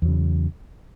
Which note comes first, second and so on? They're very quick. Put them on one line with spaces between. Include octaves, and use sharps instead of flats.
E2 F#3 C#3